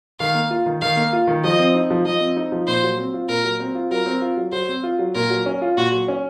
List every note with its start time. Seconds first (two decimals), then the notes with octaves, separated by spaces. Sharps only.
0.19 D#3 F5
0.35 A#3
0.50 F4
0.66 D#3
0.81 D#3 F5
0.97 A#3
1.13 F4
1.27 D#3
1.44 F3 D#5
1.59 C4
1.75 D#4
1.90 F3
2.05 F3 D#5
2.21 C4
2.37 D#4
2.52 F3
2.67 A#2 C5
2.83 F#3
2.98 C4
3.14 F4
3.29 A#2 A#4
3.44 F#3
3.60 C4
3.75 F4
3.91 F#3 A#4
4.06 C4
4.22 F4
4.37 F#3
4.52 F#3 C5
4.69 C4
4.83 F4
4.99 F#3
5.15 A#2 A#4
5.30 F#3
5.46 C#4
5.62 F4
5.77 A#2 F#4
5.92 F#3
6.08 C#4